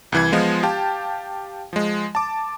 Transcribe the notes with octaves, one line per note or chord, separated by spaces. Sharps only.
C2 E3 G#6
F3 G#3 B3 F4
G4 F5 G5 A5
F3 G#3
A5 D6